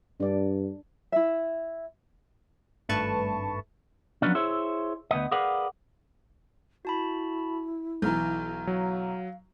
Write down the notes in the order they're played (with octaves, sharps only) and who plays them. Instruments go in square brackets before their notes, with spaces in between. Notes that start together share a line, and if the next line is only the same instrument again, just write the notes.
[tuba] G2 [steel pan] D4 D5
[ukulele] E4 E5
[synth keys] G#1 G2 A3 B4 A5 C#6
[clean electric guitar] F3 F#3 B3 C#4 D4
E4 G#4 C5 C#5 E5
D2 B3 D#5
G#4 A#4 B4 D5 F5 F#5
[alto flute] E4 [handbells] F#4 A5 B5
[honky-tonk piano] B1 E3 [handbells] A#5 F6 G6
[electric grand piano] F#3 [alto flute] F5